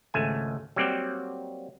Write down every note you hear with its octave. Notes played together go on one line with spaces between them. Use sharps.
G#1 C#2 A3 G#5
F#3 G3 A#3 C4 D5 G5